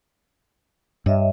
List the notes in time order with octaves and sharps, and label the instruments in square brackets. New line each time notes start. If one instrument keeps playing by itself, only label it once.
[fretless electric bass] G2 [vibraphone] C#5 D#5 E5